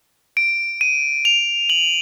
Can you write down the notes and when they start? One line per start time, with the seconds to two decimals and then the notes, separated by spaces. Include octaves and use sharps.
0.37 D7
0.81 D#7
1.25 F7
1.70 F#7